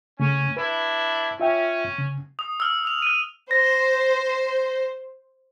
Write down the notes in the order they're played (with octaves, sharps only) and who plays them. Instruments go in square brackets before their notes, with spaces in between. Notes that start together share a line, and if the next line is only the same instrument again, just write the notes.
[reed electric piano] C#3 A3 [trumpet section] C#4
[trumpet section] D4 E4 [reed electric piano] B4
[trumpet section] C#4 [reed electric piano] F4 E5 G5
[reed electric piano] C#3
[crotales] D#6
E6 F6
E6 F7
F6 D#7
[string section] C5 [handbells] A#6